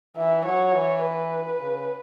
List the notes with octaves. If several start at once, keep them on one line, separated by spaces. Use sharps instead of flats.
E3 E5
F#3 C#5
E3
B4
C#3